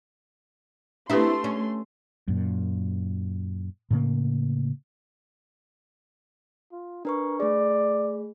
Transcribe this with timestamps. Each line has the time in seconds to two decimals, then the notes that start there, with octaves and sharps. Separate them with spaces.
1.10 A3 C4 D4 E4 G4 B4 C6
1.44 C#4
2.28 F#2 A#2
3.91 A2 C#3 A#3
6.72 F4
7.05 D4 A#4 B4 C#6
7.40 A3 G#4 D5